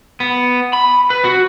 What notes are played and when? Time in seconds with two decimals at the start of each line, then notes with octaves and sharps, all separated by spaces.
0.20 B3
0.73 B5
1.10 B4
1.24 F#4